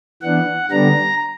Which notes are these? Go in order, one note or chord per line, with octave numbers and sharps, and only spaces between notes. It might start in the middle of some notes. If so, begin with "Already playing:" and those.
E3 B3 D4 F#5
D3 G3 B3 D4 A#5